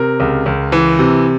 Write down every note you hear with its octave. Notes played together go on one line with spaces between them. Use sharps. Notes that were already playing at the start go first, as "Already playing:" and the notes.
Already playing: C3 A#4
C#2
C#2
E3
C3